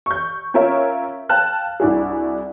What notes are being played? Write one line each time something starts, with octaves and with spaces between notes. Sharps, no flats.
C#6 G6
C#4 F4 A#4 C#5 E5
F5 G5 A5 F6 F#6
C2 D4 E4 F#4 G#4